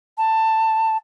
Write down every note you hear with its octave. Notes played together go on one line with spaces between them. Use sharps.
A5